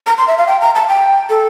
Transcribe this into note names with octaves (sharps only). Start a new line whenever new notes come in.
A#5
C6
E5
F5
G5
A#5
A5
G5
A4